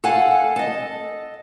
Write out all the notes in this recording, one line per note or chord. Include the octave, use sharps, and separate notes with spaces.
A4 F5 F#5 G#5
A4 D#5